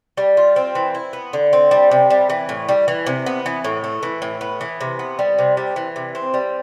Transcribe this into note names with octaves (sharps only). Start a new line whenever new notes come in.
G3
F4
C4
E3
E4
B3
D3
C4
G3
C3
G3
E3
A2
G3
E3
C3
B3
E3
A2
A3
E3
A2
B3
E3
C3
B3
G3
C3
G3
E3
C3
C4
G3